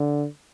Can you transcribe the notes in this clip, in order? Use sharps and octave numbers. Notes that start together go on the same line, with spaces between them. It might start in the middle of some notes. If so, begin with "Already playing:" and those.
Already playing: D3